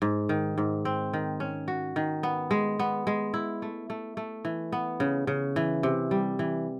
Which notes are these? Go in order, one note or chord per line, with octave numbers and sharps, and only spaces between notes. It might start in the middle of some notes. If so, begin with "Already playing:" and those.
G#2
D#3
G#2
C4
D#3
C#4
F#4
D#3
B3
G#3
B3
G#3
E4
A3
A3
A3
E3
B3
C#3
C#3
E3
C3
G3
E3